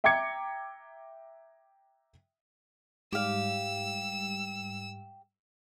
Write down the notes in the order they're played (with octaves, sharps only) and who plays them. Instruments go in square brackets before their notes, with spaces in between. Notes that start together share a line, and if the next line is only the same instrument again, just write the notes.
[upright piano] E5 G5 A#5 D6 G#6 C#7
[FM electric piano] G#2 G3 [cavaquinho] G4 F5 [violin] E6